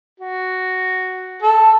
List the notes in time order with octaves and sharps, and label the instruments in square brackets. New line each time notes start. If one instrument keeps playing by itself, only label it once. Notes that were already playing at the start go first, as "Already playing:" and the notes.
[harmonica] F#4
A4